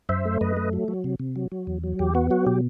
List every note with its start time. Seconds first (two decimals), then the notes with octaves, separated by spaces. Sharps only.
0.09 F#2 C5 E5
0.25 A3
0.41 F#2 B4 D#5
0.57 A3
0.73 F#3
0.88 F#3
1.04 C3
1.20 C3
1.36 F#3
1.52 F#3
1.67 E2
1.84 F#3
1.99 E2 G4
2.15 B3 F#4
2.30 F#3 F#4
2.46 B2 G4